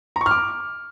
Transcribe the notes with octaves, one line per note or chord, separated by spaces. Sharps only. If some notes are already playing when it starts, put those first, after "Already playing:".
A#5
C#6
F6
D6